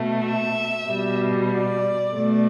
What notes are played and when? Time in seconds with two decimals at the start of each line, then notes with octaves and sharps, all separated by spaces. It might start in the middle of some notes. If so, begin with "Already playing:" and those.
Already playing: B2 A3
0.25 E5
0.89 B2 G3
1.51 D5
2.15 B2 A3